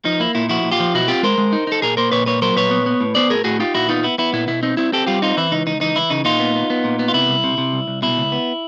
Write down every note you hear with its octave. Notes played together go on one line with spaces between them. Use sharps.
F3 D#4
A#3 E4
A#2 E4
F3 E4 F#4
A#2
F4 G4
F3
B2 E4 F#4
C4 F4 G4
G#3 A#4 C5
G#3
D#4
D#4 A4
A#2 G#4 A#4
A#3 A#4 C5
A#2 B4 C#5
A#3 B4 C#5
F#3 A#4 C5
A#2 B4 C#5
B3
B3
A2
B3 C5 D5
A2 G#4 A#4
A2 F#4 G#4
D#4 F4 G4
A#2 E4 F#4
B3 D#4 F4
B3 E4
B3 E4
A#2 E4
B2 E4
C4 D#4
C4 E4
C4 G4 A4
G3 F4 G4
C4 D#4 F4
E3 E4
C#2 D#4
C#2 D#4
E3 D#4
E3 E4
C#3 D#4
A#2 D#4 F4
B3
B3
B3
A#2
B3
F4
C3 E4
C2
C3
C3
C2
C2
B2 E4
C#2
B3